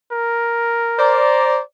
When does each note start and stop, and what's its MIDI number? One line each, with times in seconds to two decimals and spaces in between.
0.12 1.20 70
0.98 1.58 72
0.98 1.58 74
0.98 1.58 82